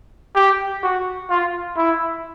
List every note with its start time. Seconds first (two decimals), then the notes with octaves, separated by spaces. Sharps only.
0.35 G4
0.83 F#4
1.29 F4
1.77 E4